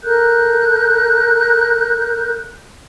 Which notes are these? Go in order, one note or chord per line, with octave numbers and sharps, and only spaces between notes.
A4 A#4 F#6 G6